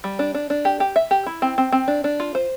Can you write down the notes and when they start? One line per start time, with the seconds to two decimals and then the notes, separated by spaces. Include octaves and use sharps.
0.04 G3
0.19 D4
0.34 D4
0.50 D4
0.65 G4
0.80 G4
0.96 E5
1.11 G4
1.26 E4
1.42 C4
1.58 C4
1.72 C4
1.88 D4
2.04 D4
2.20 F4
2.35 C5